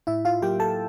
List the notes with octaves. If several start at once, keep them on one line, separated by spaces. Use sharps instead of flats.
A2 E4 E5
F4 F5
F#3 A#3 G4 G5
A4 A5